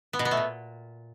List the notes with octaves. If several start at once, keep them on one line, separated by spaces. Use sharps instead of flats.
B3
B2
B3
A3
A#2